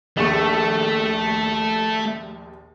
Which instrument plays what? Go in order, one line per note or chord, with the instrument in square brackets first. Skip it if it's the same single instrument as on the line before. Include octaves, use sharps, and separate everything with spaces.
[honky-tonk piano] A#1 D#2 C#6 [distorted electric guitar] A3